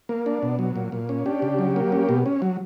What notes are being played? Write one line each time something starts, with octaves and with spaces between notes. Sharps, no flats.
A#3
D4
B2
F#3
A#2
A#2
C#4
D4 G4
C#3
F#3
A#3
C#4
B2
C#4
F#3